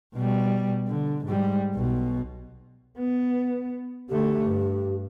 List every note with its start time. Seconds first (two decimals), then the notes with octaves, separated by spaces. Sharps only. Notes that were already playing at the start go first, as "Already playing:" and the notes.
0.15 B2 G3
0.88 D3
1.25 G#2 G3
1.75 B1 B2
2.98 B3
4.09 D3 A3 G4
4.43 G2